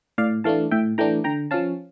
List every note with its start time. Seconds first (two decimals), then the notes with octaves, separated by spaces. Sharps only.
0.18 A2 D5 F5
0.44 E3 A3 D4 F5 A5
0.71 A2 E5 G5
0.98 E3 A3 D4 G5 A#5
1.24 D3 G5 A#5
1.51 F3 C#4 F5 A5